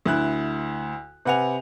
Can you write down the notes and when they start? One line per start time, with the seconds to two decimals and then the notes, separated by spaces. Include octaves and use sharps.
0.06 D2 E4 F#6
1.25 C3 B4 F#5 G#5 F7